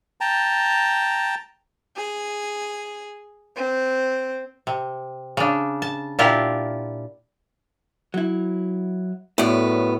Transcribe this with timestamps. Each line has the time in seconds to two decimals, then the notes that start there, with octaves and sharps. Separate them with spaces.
0.21 G5 A5 A#5
1.97 G#4
3.56 C4
4.67 C3
5.37 C#3 D4
5.82 A5
6.19 A#2 D4 E4 F4 G4 A#4
8.14 F#3 E4
9.38 F#2 A2 B3 A4 D5